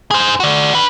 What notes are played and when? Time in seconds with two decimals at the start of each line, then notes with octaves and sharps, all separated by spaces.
0.11 G#4 C5
0.40 F#4 D5
0.75 D4 B4